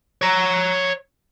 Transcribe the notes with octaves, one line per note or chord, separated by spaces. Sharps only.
C#5 A#5